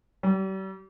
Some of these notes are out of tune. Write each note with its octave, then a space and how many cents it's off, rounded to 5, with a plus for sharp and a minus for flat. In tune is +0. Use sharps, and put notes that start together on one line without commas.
G3 -40